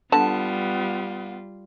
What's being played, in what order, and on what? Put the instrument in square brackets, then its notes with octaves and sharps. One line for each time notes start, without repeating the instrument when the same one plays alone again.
[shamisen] D3 [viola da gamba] G3 F4 [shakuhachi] B3 [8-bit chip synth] A5